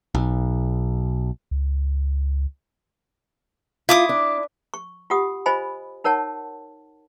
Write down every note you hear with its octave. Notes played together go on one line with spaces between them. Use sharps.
B1
C#2
E4 F4 D6 D#6
D4
C#6
F4 G4 F#5 D#6
F4 C5 D#5 G#5 B5
D#4 A#4 C#5 F#5 A5